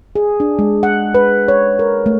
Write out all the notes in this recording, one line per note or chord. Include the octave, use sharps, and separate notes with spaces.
G#4
D4
G#3
F#5
B4
C#5
A#4
A3